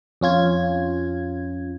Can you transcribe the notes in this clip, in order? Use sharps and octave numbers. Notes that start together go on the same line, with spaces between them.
F2 C#4 F4 G#6